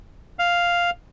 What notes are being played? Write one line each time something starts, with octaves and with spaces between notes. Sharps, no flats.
F5